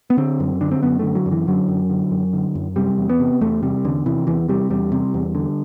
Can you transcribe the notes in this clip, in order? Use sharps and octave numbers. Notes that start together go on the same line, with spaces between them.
B3
D3 C4
F#2
D3 D4
C4
F#2 B3
D3 A3
F#3
F#2
E3
D3 F#3
F#2
D3
F#2
D3
F#2
C3 G3
E2
B3
C3
E2 A3
C3 G3
E2 D3
C3 E3
E2 E3
C3 G3
E2 G3
C3
E2
D3